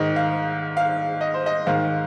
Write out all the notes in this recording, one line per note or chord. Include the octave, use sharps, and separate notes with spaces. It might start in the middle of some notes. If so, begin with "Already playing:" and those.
Already playing: G#2 D#3 D#5
F5
F5
D#5
C5
D#5
G#2 D#3 F5